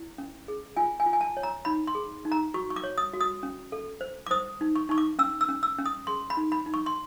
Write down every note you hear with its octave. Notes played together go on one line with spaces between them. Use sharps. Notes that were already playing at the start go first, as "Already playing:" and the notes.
Already playing: E4
C#4
G#4
F4 G#5
G#5
F4
G#5
A5
C#5
A#5
D#4 B5
C6
G#4
D#4
A#5
F#4 C#6
C#6
D6
C#5
D#6
F#4
D#6
C#4
A4
C5
D6
C5 D#6
D#4
C#6
D#4 C#6
D6
C#4 E6
E6
C#4
E6
C#4
D#6
G#4 C6
B5
D#4
B5
D#4
C#6
C6